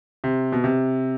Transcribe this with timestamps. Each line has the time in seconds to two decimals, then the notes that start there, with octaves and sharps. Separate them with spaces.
0.24 C3
0.52 B2
0.64 C3